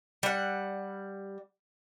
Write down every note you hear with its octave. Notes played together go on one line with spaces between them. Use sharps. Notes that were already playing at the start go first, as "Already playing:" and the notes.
G3 F#5